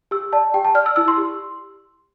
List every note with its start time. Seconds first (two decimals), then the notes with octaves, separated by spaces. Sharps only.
0.11 G4 E6
0.33 D5 A5
0.54 G4 G5
0.65 A5
0.75 D5 F6
0.86 E6
0.96 E4 E6
1.08 C6
1.17 G4